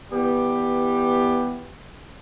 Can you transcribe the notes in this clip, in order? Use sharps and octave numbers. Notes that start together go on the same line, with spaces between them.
E3 G3 B3 G4